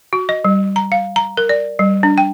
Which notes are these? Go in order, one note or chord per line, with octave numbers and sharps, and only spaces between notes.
F#4
D#5
G3
A#5
F5
A#5
A#4
D5
G3
D4
G5